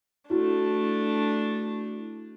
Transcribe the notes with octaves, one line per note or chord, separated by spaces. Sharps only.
A3 D4 E4 F#4